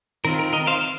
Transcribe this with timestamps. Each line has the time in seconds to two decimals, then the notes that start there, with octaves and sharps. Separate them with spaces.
0.25 D#3 C4 F4 A#4
0.39 A#4
0.53 A#4 D#5
0.67 C5 F5